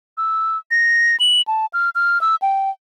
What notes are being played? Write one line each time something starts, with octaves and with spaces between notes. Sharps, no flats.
E6
A#6
F#7
A5
F6
F6
E6
G5